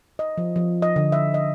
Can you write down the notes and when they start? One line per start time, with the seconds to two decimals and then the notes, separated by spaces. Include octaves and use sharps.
0.19 D#5
0.38 F3
0.56 F3
0.82 D#5
0.96 D3
1.12 E5
1.34 D#5